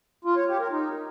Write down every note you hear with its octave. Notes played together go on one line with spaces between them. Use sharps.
F4
C#5
G4
A#4
D#4